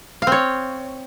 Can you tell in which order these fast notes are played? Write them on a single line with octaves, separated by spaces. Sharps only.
F5 C4 C#5